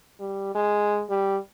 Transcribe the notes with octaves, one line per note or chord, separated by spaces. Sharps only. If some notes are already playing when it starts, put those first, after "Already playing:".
G3
G#3
G3